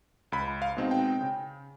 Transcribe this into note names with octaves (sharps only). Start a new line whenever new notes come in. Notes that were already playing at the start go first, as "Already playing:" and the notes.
C#2 B5
F5
B2 G#3 C4 D#4
G5
C#3